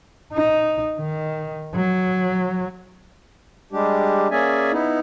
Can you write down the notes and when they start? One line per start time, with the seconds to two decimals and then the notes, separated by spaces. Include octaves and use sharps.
0.33 D#4
0.99 D#3
1.75 F#3
3.72 G3 G#3 D4 G4
4.31 A#3 C#4 G#4 D5 E5 G#5
4.72 B3 D#4 E4